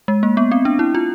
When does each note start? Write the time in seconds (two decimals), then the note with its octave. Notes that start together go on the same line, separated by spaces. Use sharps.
0.08 G#3
0.23 A#3
0.37 B3
0.52 C4
0.65 D4
0.79 E4
0.95 F4